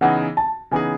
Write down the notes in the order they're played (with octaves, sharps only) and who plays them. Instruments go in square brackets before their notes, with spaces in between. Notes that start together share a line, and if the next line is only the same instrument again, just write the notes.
[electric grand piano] C#3 E3 B3 D#4 G#4 [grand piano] F#5
[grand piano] A5
[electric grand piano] C#3 E3 B3 D#4 G#4 [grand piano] G#5